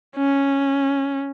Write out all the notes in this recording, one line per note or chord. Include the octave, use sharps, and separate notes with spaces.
C#4